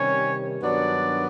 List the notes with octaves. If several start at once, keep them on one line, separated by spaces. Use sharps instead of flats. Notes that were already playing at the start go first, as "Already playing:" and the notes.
Already playing: C3 D#3 G3 C#4 C#5
G2 D#3 F#3 B3 D4 D5